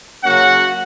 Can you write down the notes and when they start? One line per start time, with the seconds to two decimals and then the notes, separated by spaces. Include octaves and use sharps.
0.24 C#3 F#3 A#3 C#4 F#4 F#5